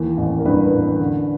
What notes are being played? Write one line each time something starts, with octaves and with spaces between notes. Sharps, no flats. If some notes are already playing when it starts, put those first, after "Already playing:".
Already playing: D#2 E3
A1
A#4
G2 B4
A1
D3